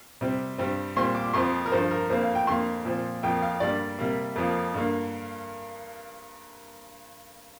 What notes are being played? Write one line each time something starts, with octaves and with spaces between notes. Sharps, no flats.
C3 G3 C4
G2 G3 C4
A#2 G3 C4 C6
D6
F2 F3 C4 C6
A#4
G2 D3 F3 C5
A#4
F2 D3 A#3 C5
F5
G5
F2 D3 A#3 C6
A#2 F3 C4
F2 F3 A#3 G5
F5
G2 D3 G3 A#3 D5
C3 G3 A#3
F2 F3 A#3
G2 D3 A#3